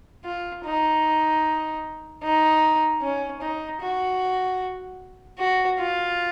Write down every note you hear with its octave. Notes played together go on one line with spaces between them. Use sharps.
F4
D#4
D#4
C#4
D#4
F#4
F#4
F4